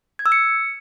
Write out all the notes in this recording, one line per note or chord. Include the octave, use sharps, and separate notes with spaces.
G#6
E6
C#7